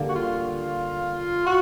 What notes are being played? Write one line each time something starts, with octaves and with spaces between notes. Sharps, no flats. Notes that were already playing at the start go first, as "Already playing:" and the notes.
Already playing: D3 G3 A#3
F#4
F4
F#4